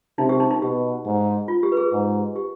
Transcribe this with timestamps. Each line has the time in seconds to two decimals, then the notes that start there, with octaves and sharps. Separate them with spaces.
0.18 C3 D#4
0.29 G4
0.40 D#4
0.51 D#4
0.62 B2 G4
1.05 G#2
1.48 F4
1.63 G4
1.72 B4
1.77 G#4
1.92 G#2
2.36 G4